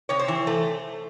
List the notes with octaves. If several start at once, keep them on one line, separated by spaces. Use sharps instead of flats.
C3 C#5
C5
E3
A3